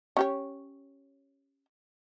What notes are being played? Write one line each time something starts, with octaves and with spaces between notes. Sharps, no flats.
C#4 G4 C#5